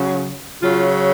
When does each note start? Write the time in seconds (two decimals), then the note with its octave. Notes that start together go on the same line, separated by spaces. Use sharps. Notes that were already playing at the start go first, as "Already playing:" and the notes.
Already playing: C#3 F#3
0.62 C#3 F#3 F4